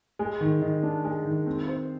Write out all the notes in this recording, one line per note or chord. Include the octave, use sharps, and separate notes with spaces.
G#3
D#3
D#3
D4
G#3
D#3
C4
C5